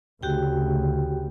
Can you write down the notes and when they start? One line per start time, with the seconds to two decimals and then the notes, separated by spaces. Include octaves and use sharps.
0.23 D2 C#3 F#4 G4 G5